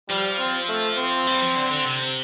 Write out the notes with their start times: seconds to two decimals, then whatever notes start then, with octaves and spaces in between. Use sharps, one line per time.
0.09 F3 G3
0.39 C4
0.69 A3
0.98 C4
1.27 G3
1.42 F3
1.56 D3
1.71 D3
1.85 C3